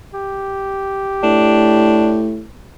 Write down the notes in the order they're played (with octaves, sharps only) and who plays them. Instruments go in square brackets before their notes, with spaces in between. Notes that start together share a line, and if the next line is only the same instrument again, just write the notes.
[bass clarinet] G4
[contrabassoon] A2 [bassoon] D4